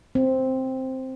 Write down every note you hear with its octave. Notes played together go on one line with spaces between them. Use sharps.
C4